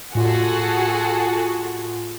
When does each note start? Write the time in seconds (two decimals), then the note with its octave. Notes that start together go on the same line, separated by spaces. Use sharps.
0.15 A2 F4 F#4 G#4 A4 C6